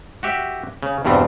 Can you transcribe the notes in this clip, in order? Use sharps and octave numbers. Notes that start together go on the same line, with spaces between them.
F#4 G4 E5
C#3
E2 G2 B2 G3 C4